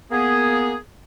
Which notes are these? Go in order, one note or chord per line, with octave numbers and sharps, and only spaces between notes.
A#3 B3 G#4